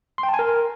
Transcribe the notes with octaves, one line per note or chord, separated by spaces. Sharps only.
C6
G5
A5
G#5
A#4